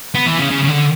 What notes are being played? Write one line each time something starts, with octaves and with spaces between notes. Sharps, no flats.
B3
E3
C#3
C#3
C#3
D3